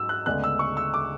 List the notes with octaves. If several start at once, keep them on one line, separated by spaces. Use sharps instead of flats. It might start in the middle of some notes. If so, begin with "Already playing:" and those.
Already playing: G#2 F#3 E6
F#6
D2 C#3 G#3 B3 D4 F#6
E6
C#6
E6
D6